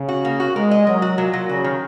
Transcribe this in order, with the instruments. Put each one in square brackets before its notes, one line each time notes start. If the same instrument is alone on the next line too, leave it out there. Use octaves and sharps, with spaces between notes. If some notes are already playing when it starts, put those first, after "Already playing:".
Already playing: [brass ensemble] C#3
[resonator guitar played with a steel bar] F#4
A#3
F#4
[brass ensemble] G#3 [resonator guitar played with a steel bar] A#4
[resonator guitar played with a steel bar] D#5
[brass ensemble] F#3 [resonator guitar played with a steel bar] A#4
[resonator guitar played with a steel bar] F#4
[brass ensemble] A#2 [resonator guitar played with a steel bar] F#3
[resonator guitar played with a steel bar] F#3
[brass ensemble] C#3 [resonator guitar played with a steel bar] F#4
[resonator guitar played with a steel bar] D#3